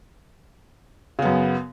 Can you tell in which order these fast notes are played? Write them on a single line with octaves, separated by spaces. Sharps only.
C#3 B3 F#2